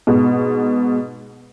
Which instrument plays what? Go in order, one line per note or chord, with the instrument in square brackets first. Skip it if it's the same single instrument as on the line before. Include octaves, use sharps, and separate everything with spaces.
[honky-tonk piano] G#2 B2